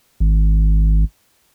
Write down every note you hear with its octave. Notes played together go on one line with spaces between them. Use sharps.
G#1